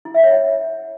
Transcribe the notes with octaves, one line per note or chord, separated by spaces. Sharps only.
E4
E5
C#5
F#5